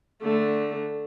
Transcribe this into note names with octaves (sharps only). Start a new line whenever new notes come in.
D3 A3